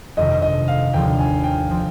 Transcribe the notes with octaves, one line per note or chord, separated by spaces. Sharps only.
G1 F2 C3 D#3 D#5
D#5
F5
D#2 D3 F3 G5
G#5
G5
F3 C4